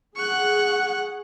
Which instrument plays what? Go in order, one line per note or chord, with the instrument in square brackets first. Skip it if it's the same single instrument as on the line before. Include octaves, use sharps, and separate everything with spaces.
[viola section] G#4 F#5 [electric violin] C#6 F#6